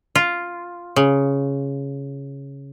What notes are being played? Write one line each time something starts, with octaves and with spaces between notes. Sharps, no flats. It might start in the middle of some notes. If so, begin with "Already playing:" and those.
F4
C#3